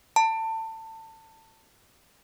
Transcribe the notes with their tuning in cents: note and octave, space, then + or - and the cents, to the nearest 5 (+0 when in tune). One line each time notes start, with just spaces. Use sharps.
A5 +25